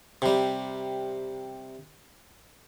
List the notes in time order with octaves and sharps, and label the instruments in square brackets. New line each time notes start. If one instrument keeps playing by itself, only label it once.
[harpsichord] C3 G3